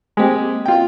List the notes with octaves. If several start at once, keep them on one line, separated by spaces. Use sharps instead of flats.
G#3 A#3 C4 G4
F4 G5